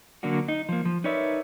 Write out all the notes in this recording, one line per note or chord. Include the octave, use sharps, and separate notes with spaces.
D3 F#3 A#3 D4 F#4
D#4
F3 A#3
F3
D#4 A#4 B4 C#5 D5 E5